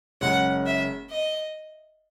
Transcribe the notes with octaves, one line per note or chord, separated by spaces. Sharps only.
F#1 F#2 C#3 G#3 C#4 F#5
E5
D#5